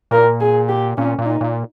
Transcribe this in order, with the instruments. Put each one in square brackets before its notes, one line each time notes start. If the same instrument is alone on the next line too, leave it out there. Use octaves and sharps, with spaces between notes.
[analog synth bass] A#2 [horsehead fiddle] A#4
[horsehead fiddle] G#4
G4
[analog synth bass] A#2 [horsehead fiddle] C#4
[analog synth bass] A#2
[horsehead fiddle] D#4
[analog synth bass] A#2